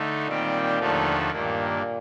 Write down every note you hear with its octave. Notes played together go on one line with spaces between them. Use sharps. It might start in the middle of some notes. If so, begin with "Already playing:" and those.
Already playing: D3 A3 D#4
A#2 D#3 G3 C4 G4
D#2 D3 F3 A3 D#4
G2 A#2 D#3 A#3